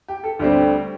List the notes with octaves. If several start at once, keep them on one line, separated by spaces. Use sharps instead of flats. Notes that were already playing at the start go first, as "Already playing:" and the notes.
G4
A4
D2 D3 G3 C4 G4